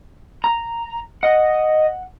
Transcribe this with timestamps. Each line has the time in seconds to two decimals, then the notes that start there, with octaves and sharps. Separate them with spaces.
0.44 A#5
1.23 D#5 F#5